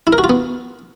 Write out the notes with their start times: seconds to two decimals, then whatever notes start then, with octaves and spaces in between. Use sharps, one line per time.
0.07 E4
0.13 A#4
0.18 F#4
0.24 F4
0.29 B3